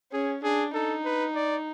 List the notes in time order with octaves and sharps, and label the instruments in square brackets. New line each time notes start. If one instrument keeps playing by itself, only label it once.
[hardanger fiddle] C#4 [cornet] G#4
[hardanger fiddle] D4 [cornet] G#4
[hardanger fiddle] D#4 [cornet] A4
[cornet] B4
D5